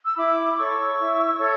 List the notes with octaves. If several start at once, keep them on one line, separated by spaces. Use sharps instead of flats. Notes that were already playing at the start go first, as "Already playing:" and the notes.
E6
E4 B5 D6
A4 C#5 C#6 E6
E4
A4 C#5